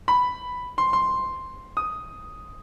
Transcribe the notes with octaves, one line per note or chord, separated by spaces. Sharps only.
B5
C6
C6
D#6